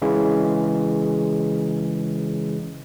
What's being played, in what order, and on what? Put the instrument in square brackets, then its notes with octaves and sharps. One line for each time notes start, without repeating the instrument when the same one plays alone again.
[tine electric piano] C#3 E3 G#3